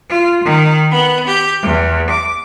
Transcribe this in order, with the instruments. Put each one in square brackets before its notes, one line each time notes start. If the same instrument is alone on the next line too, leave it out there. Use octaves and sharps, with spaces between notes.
[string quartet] F4
D#3
B3
G4
E2
D6